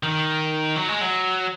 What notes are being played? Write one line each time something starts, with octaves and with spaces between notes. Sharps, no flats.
D#3
F#3
G#3
F#3